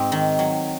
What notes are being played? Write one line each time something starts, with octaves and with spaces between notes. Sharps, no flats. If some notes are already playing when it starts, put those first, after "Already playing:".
Already playing: G#2 C4
D#3
F#3